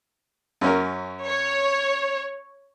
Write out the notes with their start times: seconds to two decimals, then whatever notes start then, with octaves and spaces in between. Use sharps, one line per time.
0.61 F#2 C#4 A#4
1.24 C#5